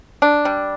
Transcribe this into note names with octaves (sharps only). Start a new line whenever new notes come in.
D4
G3